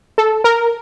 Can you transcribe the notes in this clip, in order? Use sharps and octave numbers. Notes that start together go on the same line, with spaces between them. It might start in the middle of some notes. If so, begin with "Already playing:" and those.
A4
A#4